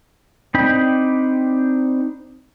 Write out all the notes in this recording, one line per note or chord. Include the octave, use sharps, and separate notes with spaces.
C4 D4 D#4 G5 B5